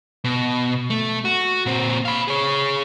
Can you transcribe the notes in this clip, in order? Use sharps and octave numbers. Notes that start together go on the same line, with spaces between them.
B2
A3
F#4
A#2 C4
F5 B5
G#4 C#5